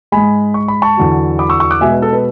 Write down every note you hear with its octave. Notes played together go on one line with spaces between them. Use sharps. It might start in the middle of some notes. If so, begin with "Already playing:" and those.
G#2 G#3 G#5 B5
C#6
B5
A5 C#6
E2 D3 F#3
B5 D6
C#6 E6
C#6 E6
D6 F#6
B2 G#3 E5 G#5
B4
A4
B4